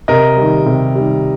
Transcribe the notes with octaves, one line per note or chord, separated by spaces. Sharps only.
C3 A#4 D#5
D#3 G3
C3
D#3 G3